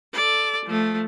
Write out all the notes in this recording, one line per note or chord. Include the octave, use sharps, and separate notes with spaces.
A4 D5
F3 A3